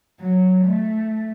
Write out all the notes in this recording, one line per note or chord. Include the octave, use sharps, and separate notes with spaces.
F#3
A3